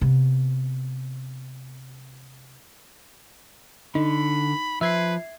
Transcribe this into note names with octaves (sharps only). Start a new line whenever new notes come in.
C3 B3
D3 D#4 B5
F3 B4 E5 G#6 C7